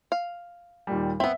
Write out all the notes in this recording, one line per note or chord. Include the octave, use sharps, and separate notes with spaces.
F5
D#2 A#2 G3
B3 C4 E5